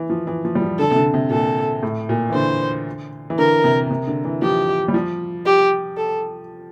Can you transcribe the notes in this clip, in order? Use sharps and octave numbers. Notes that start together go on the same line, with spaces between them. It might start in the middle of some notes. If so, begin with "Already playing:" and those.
Already playing: E3
F3
E3
F3
G3
F3
D3 A4
C3
D3
C3
A#2 A4
A2
A#2
E3
D3 C5
E3
D3 A#4
C3
C3
D3
E3
F3 G4
G3
F3
G4
A4